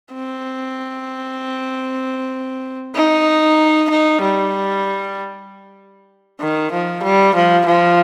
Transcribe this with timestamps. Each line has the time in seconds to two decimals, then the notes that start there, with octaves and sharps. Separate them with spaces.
0.14 C4
2.95 D#4
3.90 D#4
4.22 G3
6.40 D#3
6.72 F3
7.03 G3
7.35 F3
7.66 F3